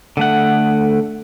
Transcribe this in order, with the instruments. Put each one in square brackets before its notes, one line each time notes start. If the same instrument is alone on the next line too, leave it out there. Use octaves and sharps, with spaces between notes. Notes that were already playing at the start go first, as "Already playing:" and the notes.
[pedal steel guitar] D3 A3 F#5